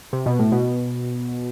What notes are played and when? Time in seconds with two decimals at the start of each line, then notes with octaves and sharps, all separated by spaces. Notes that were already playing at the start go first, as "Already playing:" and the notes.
0.13 C3
0.26 B2
0.39 A2
0.52 B2